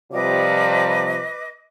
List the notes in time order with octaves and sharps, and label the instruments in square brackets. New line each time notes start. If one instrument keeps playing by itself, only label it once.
[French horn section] C3 F3 G3 [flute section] B4 D#5 D6